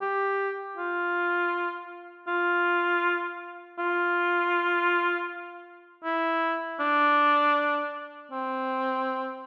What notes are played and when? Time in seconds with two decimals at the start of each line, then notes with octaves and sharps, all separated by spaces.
0.02 G4
0.77 F4
2.28 F4
3.79 F4
6.05 E4
6.80 D4
8.32 C4